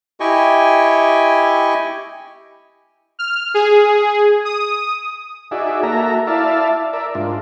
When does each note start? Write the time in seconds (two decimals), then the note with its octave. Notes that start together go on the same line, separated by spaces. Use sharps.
0.20 E4 G4 D#5 G5 G#5 C#6
3.19 F6
3.54 G#4
4.45 D#6
5.51 D#4 F#4 G#4 D5 E5
5.83 A#3 F#4 A4 E5 A#5
6.27 E4 D5 E5 F5 A5
6.93 A#4 D5 E5
7.15 G#2 D4 F4